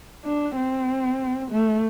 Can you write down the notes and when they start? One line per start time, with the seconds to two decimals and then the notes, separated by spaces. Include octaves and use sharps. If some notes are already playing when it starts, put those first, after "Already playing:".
0.25 D4
0.56 C4
1.51 A3